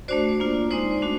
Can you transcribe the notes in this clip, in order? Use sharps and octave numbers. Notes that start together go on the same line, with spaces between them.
A3 D4 F#4 C5 D5
A#3 D4 F4
G#3 C4 D#4 C5 D5
A3 D4 F#4